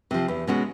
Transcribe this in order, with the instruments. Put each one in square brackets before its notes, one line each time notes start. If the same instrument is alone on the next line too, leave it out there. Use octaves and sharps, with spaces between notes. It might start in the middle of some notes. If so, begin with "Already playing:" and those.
[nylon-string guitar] C3 F3
E2
B2 G#3 C#4 F#4